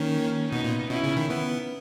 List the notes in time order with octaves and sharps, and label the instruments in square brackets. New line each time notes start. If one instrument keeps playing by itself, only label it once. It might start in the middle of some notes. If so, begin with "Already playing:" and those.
Already playing: [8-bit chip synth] D#3 [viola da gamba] A#3 C#4
[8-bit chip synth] B2 [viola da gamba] B3 D#4
[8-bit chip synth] A#2
[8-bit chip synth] B2 [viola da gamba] C#4 E4
[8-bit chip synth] C#3
D#3
B3